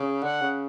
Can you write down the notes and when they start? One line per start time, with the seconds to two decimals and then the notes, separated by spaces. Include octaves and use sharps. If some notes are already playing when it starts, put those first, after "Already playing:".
Already playing: C#3
0.23 D3 F#5
0.41 C#3